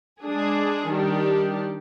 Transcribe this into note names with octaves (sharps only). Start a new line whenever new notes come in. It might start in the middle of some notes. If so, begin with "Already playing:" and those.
G#3 D4 G#4
D#3 G3 D4 G4